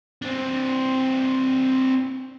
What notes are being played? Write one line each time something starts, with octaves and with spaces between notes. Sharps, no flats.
C4 D4